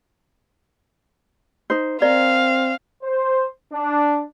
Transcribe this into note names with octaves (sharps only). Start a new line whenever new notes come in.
D#4 C5
C4 A#4 D5 F5
C5
D4